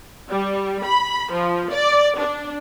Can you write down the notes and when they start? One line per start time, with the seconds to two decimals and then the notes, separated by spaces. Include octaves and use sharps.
0.30 G3
0.84 B5
1.34 F3
1.72 D5
2.19 D4